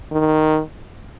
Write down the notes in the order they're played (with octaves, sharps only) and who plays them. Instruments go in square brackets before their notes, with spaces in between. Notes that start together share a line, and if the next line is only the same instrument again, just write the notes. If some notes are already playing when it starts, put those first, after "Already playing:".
[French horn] D#3